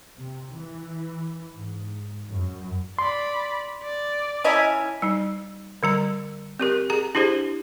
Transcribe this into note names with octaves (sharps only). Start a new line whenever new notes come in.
C3
E3
G#2
F#2
D5 B5 C6
D5
C#4 E4 D#5 G#5 A#5 B5
G3 D#4
D3 G3 A#5
C4 G4 A#4
G#4 A#5
D4 E4 G4 G#4 C5